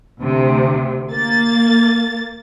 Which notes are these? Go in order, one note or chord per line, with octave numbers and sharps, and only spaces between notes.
D2 C3
A#3 A6